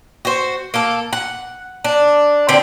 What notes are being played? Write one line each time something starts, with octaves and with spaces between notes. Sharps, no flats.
F#4 C5
A#3 A4
F#5
D4
D3 C4 G4 D5